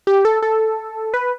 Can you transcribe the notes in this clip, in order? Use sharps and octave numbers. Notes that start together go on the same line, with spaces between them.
G4
A4
A4
B4